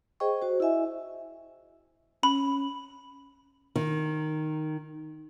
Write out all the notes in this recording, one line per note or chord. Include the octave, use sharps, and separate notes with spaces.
G#4 C5 D#5 G5 C#6
F#4 C5
E4 D#5 E5 G#5
C#4 B5
D#3